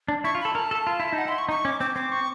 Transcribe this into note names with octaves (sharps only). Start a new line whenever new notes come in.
D4
E4 C#6
F4
A4 B5
A#4 A5
A4
F4
E4
D#4
F#5
E4 C6
C#6
D#4 C#6
C#4 D6
C4 D6
C4 D6
C#6